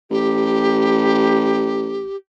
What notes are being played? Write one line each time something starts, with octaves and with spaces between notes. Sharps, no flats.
A1 G4